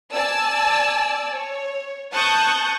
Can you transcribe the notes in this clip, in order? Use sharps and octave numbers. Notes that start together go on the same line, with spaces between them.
D5 G#5 A5 E6
C#5
A5 C#6 D#6 F#6 G6